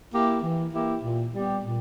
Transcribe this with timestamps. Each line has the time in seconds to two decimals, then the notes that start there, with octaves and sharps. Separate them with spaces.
0.11 A#3 E4 G4
0.41 E3
0.71 A#3 E4 G4
1.02 A#2
1.33 G3 B3 G4
1.63 A#2